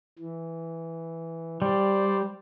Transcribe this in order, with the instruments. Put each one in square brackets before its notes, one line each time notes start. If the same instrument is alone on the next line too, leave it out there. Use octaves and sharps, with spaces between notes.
[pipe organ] E3
[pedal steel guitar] G3 [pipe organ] C5 D5